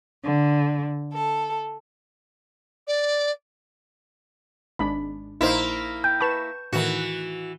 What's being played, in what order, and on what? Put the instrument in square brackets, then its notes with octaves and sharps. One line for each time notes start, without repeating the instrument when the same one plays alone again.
[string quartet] D3
A4
[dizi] D5
[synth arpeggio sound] G#1 G#3 D4 [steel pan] B5
[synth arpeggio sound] A#1 [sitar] A#3 E4 [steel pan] D#4 C5
[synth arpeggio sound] G5 [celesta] G6
[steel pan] B4 A5 B5 [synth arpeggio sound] C#6 E7
[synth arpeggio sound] A2 D#3 [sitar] E3 F#4